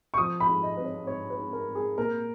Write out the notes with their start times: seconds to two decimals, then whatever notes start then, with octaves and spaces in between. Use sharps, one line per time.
0.14 C#6
0.18 F3 D#6
0.40 B5
0.47 G#2
0.63 D#5
0.77 G#2 B4
0.85 C#5
1.07 G#2 C#5
1.30 B4
1.37 G#2
1.53 A#4
1.68 G#3
1.75 G#4
1.98 A#2 A#4